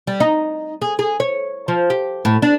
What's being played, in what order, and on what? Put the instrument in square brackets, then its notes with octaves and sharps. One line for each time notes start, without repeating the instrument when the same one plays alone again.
[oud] G3
D#4
G#4
G#4
C#5
F3
G4
A2
D4